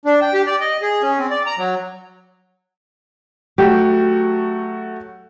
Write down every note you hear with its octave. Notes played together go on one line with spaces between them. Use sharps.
D4
G5
G4
D5
D#5
G#4
C#4
C4
D5
A#5
F#3
F#3 A3 F#4 G4